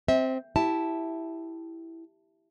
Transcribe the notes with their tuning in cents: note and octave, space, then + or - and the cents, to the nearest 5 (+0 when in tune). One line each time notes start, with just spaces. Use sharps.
C4 +0 E5 -30
E4 +0 G4 +0 A5 +0